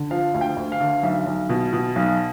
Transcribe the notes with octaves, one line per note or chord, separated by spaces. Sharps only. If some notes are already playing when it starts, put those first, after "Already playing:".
Already playing: D3
F3 F5
D2
G5
D2
F5
D3
B1 E5
B1
B2
B2
B1